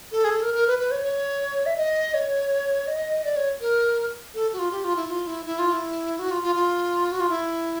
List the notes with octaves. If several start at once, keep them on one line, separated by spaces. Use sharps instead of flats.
A4
G#4
A4
A#4
A#4
B4
B4
C#5
C#5
E5
D#5
C#5
D#5
D5
C#5
A#4
A4
F#4
F4
G4
F4
E4
F4
E4
E4
F4
E4
F#4
F4
F4
F4
F#4
F4
E4